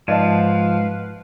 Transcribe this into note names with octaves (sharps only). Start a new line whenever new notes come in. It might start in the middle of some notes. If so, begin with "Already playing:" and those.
G#2 F3 B4 D5 D#5 F5 A5